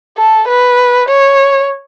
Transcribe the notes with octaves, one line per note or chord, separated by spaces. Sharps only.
A4
B4
C#5